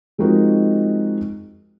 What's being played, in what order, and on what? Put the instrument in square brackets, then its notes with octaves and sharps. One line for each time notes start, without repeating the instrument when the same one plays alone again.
[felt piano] F3 G#3 C4 D#4 F#4 A#4